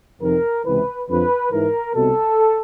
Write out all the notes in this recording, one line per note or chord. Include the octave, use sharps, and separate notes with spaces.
F2 C3 D#3 A#4
C#2 C3 E3 B4
F2 D3 F3 B4
G#2 E3 A#4
C2 B2 A4